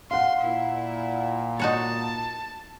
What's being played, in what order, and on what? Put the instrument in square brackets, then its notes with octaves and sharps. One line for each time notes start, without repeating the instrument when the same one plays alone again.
[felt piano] F5 F#5 [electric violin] C6
[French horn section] A#2 [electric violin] E4
[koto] D#4 F#4 C#5 [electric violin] A5